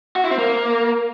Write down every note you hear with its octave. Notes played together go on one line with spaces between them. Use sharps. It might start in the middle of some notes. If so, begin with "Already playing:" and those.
F#4
E4
C4
A#3